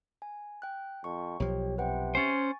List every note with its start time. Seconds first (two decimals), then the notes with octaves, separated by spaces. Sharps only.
0.22 G#5
0.62 G5 F#6
1.04 F2 C#6
1.40 B1 F3 G4 C#5
1.78 C3 B4 F#5 G5
2.15 C#4 C5 G#5 C#6 A6